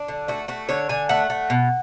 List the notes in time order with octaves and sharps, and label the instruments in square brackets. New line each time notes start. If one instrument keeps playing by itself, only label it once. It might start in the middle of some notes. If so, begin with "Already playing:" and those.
Already playing: [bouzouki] D4
D3
A3 F#4
A3 F#4
D3 C#5
D3 G#5
A3 F#5
A3
B2